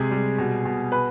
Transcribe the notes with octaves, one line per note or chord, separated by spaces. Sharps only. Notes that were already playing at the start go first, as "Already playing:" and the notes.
Already playing: C3 G#3 G#4
G3
B2
B2
B4 B5